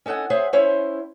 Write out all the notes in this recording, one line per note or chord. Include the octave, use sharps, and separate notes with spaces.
C#4 D#4 A4 F#5 G#5
G#4 C5 C#5 E5 F#5
C#4 E4 C5 C#5